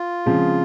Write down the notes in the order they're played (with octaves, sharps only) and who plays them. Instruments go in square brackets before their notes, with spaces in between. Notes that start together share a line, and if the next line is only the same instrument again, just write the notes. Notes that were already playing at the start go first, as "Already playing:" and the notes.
Already playing: [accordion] F4
[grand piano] C#3 F3 G#3 C4